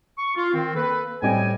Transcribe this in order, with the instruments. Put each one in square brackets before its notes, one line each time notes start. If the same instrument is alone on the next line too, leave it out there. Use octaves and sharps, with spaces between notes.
[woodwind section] C#6
F4
D#3 C4
A#3 A4 B4
[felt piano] A2 G3 C4 [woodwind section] D#5 G5 G#5